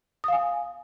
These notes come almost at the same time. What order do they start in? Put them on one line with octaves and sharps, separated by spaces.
D#6 F5 G#5